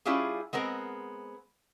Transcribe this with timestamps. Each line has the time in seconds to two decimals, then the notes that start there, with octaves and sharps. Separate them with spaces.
0.05 G3 C#4 E4 F4 G4 G#4
0.53 G#3 B3 C4 A#4